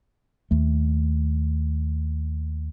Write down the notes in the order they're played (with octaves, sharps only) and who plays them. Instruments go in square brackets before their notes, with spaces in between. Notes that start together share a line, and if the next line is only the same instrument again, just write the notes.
[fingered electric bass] D#2 A3